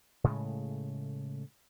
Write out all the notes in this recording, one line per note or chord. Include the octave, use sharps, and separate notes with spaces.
A2 C#3 G#3 A3